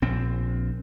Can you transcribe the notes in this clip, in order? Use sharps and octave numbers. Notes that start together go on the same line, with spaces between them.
A#1 C4